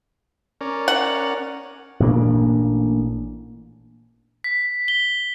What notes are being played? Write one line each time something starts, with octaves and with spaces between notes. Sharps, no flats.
C#4 A#4 D5
F#5
A1 A#2 A#3 D4
B6
G7